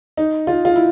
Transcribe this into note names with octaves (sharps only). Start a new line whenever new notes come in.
D#4
F4
F4
E4